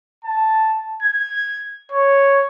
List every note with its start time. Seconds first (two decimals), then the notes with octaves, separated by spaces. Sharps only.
0.24 A5
1.02 G#6
1.92 C#5